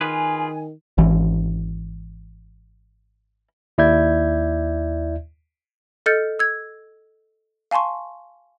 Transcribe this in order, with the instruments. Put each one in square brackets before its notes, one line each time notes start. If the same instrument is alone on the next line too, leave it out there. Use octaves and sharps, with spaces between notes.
[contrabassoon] D#3 [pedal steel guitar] F4 G#4 B4 [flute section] G#5
[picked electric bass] G#1 E3
[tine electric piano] D#2 E4 D5 E5 G6 G#6
[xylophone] A4 D#5 F6 G6 A6 C#7
E6 G#6
F5 G#5 A5 C6 C#6